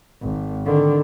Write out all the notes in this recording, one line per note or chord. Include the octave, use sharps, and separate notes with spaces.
G#1
D3 D#3